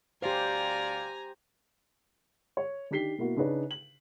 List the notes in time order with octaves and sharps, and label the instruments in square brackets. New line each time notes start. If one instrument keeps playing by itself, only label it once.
[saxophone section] D2 D5 F5 [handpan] G4 C5 [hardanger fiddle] G#5 A#5
[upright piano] C#5
D#3 D4 G4 B6 C7 G7
B2 A#3 E4 F#4
C#3 D4 D#4 B4 C#5
F#7